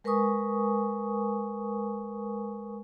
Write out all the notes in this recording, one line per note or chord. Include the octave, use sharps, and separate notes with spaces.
G#3 A#4 B4 G#5 C#6 D#6